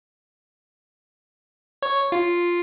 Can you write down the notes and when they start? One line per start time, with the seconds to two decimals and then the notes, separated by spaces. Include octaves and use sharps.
1.82 C#5
2.12 F4